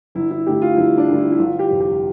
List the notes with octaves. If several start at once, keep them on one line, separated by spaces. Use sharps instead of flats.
G1 E4
E4
G2 D3 A3 G4
F4
G1 E4
D4
G2 D3 A3
E4
E4
G1 F4
G4
F2 C3 G3
G4